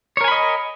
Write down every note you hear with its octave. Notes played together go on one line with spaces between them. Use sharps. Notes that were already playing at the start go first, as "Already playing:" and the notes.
A#4 C#5 D#5 G#5 B5